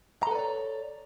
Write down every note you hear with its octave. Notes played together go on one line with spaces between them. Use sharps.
A4 B4 C#5 D5 A#5